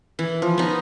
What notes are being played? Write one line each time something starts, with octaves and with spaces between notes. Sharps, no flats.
E3
F3
B3 D#4